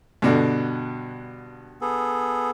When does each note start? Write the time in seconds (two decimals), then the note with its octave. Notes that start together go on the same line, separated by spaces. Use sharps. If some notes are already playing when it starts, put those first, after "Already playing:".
0.22 G2 B2 D3
1.81 B3 G#4 A4